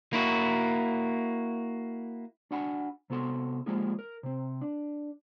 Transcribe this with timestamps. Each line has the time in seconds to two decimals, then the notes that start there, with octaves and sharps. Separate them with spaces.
0.13 A#3 E4 F#4
2.51 D4 F#4 F#5 G#5 B5
3.10 C3 B3 F#4 A4 C6
3.66 F3 G#3 A#3 F4 G4 G#4
3.99 A#4
4.23 C3 C4
4.61 D4